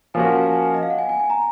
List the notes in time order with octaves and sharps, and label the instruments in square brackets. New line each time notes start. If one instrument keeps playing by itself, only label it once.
[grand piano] F3 A#3 C#4 F#4 [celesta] G#5
[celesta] F#5
G#5
D#5
F5
F#5
G#5
G#5
G#5
A#5